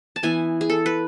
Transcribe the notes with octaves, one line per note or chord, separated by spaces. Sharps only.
A5
E3 B3 E4 G#5
G#4
A4
B4